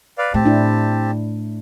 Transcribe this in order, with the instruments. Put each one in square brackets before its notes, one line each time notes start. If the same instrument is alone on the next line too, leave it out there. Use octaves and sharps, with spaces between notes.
[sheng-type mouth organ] B4 D5 F5
[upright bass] A2 [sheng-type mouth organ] C4 G4 A5
[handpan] D4 E4